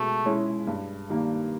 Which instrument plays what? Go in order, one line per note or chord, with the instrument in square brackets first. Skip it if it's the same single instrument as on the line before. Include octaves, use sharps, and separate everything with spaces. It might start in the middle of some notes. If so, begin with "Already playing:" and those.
Already playing: [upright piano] B2 G#3 G#4 [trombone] A3
[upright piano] G#3 C#4 E4 G#4
G2
D#3 G3 A#3